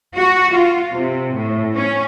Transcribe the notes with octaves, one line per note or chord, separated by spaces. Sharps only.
F#4
F4
C3
A2
C#4